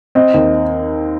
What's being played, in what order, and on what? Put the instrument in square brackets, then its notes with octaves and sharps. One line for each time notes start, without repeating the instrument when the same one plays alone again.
[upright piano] C4 [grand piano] D#5
[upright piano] D#2